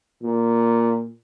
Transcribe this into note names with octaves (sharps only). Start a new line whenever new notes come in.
A#2